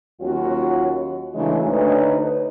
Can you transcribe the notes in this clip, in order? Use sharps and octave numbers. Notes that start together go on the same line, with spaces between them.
D#2 F#3 C#4 F4 F#4
C#3 E3 F#3 G#3 A3 D4
D2 D4 D#4 B4 C#5 D#5